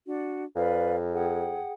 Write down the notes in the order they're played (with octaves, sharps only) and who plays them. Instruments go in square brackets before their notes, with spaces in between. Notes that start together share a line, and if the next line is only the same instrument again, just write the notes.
[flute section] D4 F#4
[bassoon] F2 [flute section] B4 D5 F5
[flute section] G#4 F#5 G5